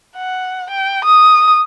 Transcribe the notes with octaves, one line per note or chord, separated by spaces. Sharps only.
F#5
G5
D#6